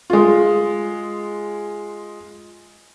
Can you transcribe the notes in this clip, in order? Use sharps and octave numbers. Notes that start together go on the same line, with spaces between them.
G#3 F4